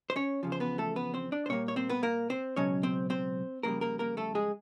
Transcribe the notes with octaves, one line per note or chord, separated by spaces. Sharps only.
C5
C#4 C#5
E2 C#3 F3
C5
B3 B4
A3 A4
B3 B4
C4 C5
D4 D5
C5
A#2 G3 A#3 C#4 C#5
C#5
C4 C5
B3 B4
A#3 A#4
C4 C5
C#2 B2 F#3 C#4 C#5
C4 C5
C4 C5
F2 C#3 E3 G3 A#3 A#4
A#3 A#4
A#3 A#4
A3 A4
G#3 G#4